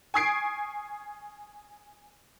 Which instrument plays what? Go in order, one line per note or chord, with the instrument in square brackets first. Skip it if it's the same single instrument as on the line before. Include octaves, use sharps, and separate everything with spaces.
[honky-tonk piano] G#5 C#6 D#6 G#6 C7 D7